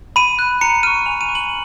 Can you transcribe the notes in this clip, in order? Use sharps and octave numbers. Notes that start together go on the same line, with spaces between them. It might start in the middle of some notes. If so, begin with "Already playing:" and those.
B5 D#7
F#6
A#5 C#7
C#6 F6 D#7
G#5 F7
D#7
C#6 F#6
F#7